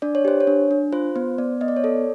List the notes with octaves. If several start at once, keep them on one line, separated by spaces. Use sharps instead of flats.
D4 D5
C#5
G4 C5
C#5
D4
D4
F4 C5
B3 C5
B3 D5
B3 D#5
D5
C#5
A4 D5